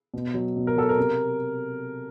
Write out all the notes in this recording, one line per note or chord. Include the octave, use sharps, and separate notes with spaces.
B2
F#3
B2
A#4
F#3 A4
A#4
C3